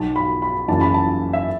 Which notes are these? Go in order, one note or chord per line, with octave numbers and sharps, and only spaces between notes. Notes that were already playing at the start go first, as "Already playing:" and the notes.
Already playing: B1 B2 A5
B5
B5
F#1 F#2 E3 A5
B5
A5
E5